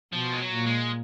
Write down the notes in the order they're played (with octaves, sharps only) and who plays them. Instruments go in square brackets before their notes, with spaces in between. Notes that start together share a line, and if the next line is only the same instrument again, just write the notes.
[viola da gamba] B2 [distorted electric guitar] F3
[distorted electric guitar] G#3
F#3
[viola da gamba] A#2
[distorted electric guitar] G#3